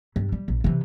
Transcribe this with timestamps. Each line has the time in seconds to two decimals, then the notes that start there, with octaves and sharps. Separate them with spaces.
0.16 G2
0.32 G3
0.48 A#1
0.64 C3 E3